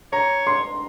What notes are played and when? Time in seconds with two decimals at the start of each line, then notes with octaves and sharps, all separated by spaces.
0.12 C#5 A#5
0.47 C6